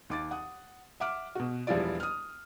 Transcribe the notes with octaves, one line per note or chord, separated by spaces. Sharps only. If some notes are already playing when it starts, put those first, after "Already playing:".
D#2 D6 A6
F#5 D#6
E5 F#5 D6 F6
B2 F#4
E1 F3 G3 E4 F4 D5
D#6 F6